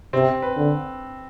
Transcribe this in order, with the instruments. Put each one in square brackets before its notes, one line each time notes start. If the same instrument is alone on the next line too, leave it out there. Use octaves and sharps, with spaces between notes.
[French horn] C3 [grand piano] C4
[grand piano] B4
[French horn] D3